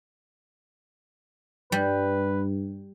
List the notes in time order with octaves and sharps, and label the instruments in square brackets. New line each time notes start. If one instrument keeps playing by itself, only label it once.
[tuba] G2 [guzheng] G3 [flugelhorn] B4